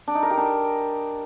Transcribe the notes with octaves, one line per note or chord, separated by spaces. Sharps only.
D4
D#4
A#4
G4
D4